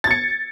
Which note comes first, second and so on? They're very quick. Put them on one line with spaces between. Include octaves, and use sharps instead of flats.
A6 G#6 C#7